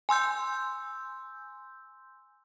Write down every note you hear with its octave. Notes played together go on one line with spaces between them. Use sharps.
G#5 C6 E6 G6